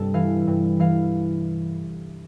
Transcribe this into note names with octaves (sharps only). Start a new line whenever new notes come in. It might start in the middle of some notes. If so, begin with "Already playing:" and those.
Already playing: G2 C3 A4
E3 F5
G2
E3 F5